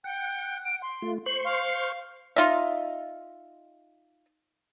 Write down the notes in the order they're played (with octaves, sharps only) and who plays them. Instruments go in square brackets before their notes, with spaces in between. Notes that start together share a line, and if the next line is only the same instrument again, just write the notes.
[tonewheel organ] F#5 [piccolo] G5
[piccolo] D7
C6
[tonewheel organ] A3 F4
[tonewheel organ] C5 C6 C#6 [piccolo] F#7
[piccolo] F5
[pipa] D#4 F4 D#5 E5